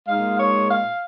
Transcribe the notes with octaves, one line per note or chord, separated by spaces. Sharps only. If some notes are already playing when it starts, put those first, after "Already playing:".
A#2 G#3 D#4 F5
C#5
F5